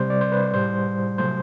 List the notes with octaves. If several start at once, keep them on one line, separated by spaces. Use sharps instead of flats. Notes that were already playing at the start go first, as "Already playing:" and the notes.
Already playing: C3 G3 C5
D5
C5
B4
A2 G3 C5
C3 F#3 A3 C5